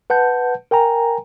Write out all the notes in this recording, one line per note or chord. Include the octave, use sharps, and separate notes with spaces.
B4 F#5 A5 G6
A#4 G5 G#5 A#5